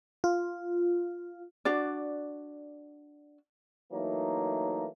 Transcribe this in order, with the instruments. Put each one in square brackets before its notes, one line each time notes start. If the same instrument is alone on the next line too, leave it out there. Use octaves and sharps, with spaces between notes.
[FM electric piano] F4
[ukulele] D4 F#4 D5
[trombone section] E3 F#3 A3 A#3 D#4